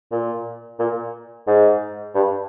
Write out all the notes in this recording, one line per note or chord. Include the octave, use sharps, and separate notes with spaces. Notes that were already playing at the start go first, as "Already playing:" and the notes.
A#2
A#2
G#2
G2